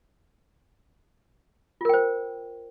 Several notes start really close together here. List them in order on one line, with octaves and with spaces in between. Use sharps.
F4 A#4 G5 C5